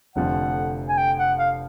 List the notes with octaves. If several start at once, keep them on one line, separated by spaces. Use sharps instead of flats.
F1 F2 D3 F3 A3 F#5
G#5
G5
F#5
F5